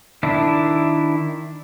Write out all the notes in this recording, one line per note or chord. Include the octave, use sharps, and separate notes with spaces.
D#3 D4 E4